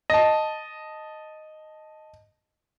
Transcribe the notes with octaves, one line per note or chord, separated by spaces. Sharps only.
D#5 A5